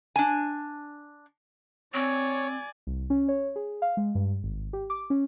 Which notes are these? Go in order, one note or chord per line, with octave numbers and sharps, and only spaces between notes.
D4 G#5
C4 C#5 D5 G#5
C2
C#4
C#5
G#4
F5
G#3
G2
G#1
G4
D6
C#4